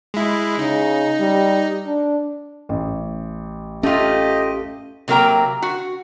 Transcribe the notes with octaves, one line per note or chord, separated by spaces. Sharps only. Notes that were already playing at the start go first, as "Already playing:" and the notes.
G#3 E4
C#3 D#4
G3
D4
A1
A3 C#4 F4 G4 D#5
C3 F#3 A#3 A#4 G5 A#5
F#4